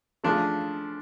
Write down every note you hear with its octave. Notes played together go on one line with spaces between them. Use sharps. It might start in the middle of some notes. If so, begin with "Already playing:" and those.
C#3 F3 A3 D4